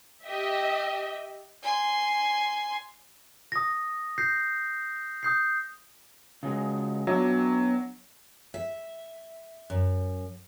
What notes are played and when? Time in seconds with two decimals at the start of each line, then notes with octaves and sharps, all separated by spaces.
0.24 G4 D#5 E5 G5
1.63 G#5 C6
3.52 D#6 A#6
4.18 G6 A#6 C7
5.23 D#6 G6 C7
6.43 C#3 F#3 G#3
7.07 F#3 B3 D4 E5
8.54 E5
9.70 F#2